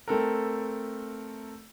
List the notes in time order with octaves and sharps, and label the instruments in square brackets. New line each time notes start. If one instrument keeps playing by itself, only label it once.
[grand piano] A3 C4 A4 A#4